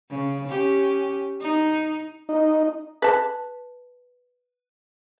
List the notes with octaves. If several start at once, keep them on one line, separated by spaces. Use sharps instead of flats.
C#3
C#4 G4
D#4
D#4
B4 A5